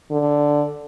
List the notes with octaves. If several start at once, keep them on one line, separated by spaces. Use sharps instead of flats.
D3